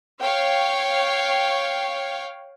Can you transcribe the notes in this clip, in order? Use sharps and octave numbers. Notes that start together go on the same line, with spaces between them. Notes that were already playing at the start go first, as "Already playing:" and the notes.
C#5 F5 G5